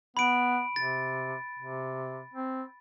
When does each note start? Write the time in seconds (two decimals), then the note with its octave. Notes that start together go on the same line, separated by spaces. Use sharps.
0.17 B3 B5 D7
0.76 C3 A6
1.59 C3
2.33 C4